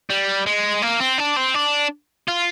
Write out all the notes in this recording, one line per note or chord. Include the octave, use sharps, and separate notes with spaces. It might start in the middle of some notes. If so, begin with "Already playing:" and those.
G3
G#3
A#3
C4
D4
C4
D4
F4